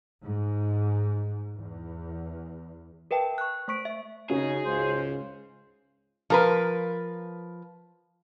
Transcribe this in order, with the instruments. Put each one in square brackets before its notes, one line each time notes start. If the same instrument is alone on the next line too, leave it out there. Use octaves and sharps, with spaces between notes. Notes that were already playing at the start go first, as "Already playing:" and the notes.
[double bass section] G#2
E2
[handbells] A#4 B4 E5 G5 A5
C#6 F#6
A3 C5 C#6 B6 D7
E5
[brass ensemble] C#3 D#4 [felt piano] C#4 F#4 C#5 [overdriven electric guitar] G#4
[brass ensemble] C#2 G#2 C#3 [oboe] C5
[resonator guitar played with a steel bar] F3 A#4 B4